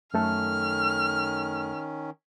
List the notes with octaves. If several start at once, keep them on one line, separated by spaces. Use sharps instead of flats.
F#2 D#3 A3 C#4 A4 F6